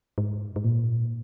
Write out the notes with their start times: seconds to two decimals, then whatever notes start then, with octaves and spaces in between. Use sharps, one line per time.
0.18 G#2
0.56 G#2
0.64 A#2